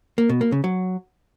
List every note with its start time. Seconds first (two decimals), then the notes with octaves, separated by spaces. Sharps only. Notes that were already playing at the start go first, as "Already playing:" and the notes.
0.18 A#3
0.29 B2
0.41 A#3
0.52 C#3
0.64 F#3